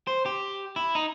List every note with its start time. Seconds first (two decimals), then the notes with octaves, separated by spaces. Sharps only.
0.07 C5
0.26 G4
0.76 E4
0.95 D#4